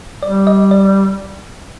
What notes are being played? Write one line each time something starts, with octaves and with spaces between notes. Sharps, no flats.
G3 D5
D#5
D5